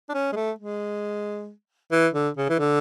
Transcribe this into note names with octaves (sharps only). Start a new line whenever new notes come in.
D4
C#4
G#3
A3
G#3
E3
D3
C#3
E3
D3